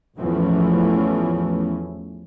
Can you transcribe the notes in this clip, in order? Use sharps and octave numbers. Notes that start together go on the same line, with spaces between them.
A1 E2 E3 F3 A3 C#4